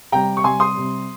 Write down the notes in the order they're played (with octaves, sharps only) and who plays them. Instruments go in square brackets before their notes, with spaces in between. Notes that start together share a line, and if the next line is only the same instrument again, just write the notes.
[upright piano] C3 G3 G5 A#5
C#6
C3 G3 G#5 C6
C6 D#6
C3 G3